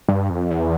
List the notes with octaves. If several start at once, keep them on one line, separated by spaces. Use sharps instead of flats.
G2
F2
E2